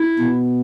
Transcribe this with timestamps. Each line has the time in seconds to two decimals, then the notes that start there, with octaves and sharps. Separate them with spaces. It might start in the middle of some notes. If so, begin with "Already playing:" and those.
Already playing: E4
0.19 B2